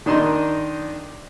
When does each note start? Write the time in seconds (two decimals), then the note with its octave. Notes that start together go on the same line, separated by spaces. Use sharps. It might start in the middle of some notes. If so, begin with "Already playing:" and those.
0.06 D#3 D4 D#4 D#5 C6